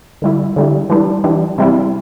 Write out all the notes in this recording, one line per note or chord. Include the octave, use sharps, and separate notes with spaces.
D3 G3 E4
D3 G3 E4
E3 G3 D4
E3 G3 D4
C3 G3 E4